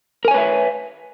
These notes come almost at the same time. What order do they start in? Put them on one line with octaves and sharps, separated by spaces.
A#4 G#5 C#5 B4 E5